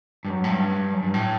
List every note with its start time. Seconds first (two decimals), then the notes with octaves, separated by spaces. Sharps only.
0.25 G2
0.29 F#2
0.44 A2
0.51 G2
0.93 F#2
1.03 G2
1.14 A2